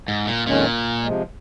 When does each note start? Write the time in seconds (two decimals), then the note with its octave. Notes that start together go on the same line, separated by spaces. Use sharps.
0.08 G#2
0.27 A#2
0.46 F2 A#2 D#3 G#3 C#4
1.03 C3 F3 G#3